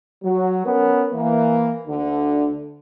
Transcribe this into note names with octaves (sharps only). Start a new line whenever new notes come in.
F#3
B3 C#4 A#4
E3 A#3
D2 D3